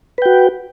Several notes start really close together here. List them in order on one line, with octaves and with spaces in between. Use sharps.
B4 G5 F#4